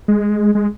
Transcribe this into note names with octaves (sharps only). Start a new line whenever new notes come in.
G#3
G#3